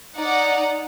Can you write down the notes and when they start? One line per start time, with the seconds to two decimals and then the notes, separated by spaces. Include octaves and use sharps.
0.17 D#4 D5 F#5 A#5